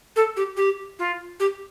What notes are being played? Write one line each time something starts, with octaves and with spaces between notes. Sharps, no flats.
A4
G4
G4
F4
G4